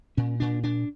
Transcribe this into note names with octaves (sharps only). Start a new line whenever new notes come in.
A#2 C#4
A#2 D4
A#2 D4